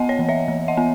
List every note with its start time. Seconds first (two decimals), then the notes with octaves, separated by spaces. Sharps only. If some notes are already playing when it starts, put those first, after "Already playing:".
Already playing: B3 D#5 F#5
0.09 C#5
0.19 E3
0.29 C#5 E5
0.48 E3
0.68 D#5 F#5
0.77 B3